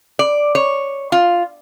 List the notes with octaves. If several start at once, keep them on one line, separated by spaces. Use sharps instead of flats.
D5
C#5
F4